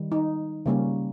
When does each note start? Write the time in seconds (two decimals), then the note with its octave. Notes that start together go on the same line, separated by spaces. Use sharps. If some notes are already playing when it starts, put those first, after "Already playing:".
Already playing: D#3 G3
0.12 D#4
0.66 C#3 G3 A#3 C#4